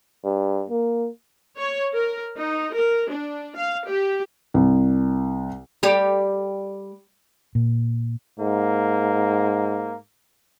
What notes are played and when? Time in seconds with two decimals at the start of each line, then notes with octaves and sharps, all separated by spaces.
0.24 G2
0.70 A#3
1.57 C#5
1.93 A#4
2.38 D#4
2.75 A#4
3.10 D4
3.57 F5
3.88 G4
4.54 C2
5.83 G3 G4
7.55 A#2
8.39 G#2 A#3